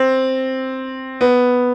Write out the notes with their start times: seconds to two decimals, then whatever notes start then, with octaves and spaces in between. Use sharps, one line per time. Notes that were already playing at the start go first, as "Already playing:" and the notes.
Already playing: C4
1.21 B3